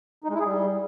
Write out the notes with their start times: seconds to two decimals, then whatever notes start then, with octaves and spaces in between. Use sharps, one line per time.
0.24 D#4
0.29 G#3
0.34 E4
0.39 G#4
0.45 G3